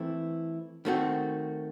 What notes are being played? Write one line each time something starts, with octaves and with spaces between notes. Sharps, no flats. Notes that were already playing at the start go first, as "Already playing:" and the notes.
Already playing: E3 A3 C4 E4
D#3 A3 C4 F#4